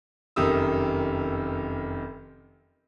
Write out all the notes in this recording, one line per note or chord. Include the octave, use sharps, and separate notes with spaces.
F1 F#2 D#3 G4 D#6 E6